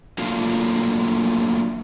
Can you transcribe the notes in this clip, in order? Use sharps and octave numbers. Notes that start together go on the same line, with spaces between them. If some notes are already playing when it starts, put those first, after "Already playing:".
F#3 A3 A#3 D4 F4